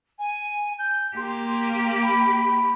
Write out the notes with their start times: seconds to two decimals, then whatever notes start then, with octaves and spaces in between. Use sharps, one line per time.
0.18 G#5
0.78 G6
1.16 A#3 G4 C6
2.02 B5